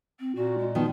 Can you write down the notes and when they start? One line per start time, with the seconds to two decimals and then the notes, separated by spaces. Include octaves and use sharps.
0.20 C4
0.36 A#2 F#4
0.58 G#3
0.75 D#3 F3 B3